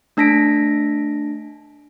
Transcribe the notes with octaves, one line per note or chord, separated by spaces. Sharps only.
A3 D4 A5 A#6 B6 D7